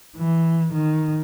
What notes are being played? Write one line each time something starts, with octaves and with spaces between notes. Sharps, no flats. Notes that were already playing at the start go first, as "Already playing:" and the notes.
E3
D#3